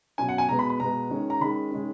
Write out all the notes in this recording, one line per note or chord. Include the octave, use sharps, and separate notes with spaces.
B2 F#3 C#4 G#5
F#5
G#5
B2 G#3 B3 A#5
B5
B5
B2 G#3 B3 A#5
D#3 G#3 C#4
A#5
D#3 G#3 C#4 B5
D#3 G#3 C#4